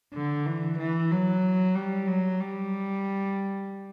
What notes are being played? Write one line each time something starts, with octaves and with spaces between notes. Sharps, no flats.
D3
E3
E3
F#3
G3
F#3
G3